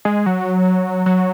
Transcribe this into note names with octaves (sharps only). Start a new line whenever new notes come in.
G#3
F#3
F#3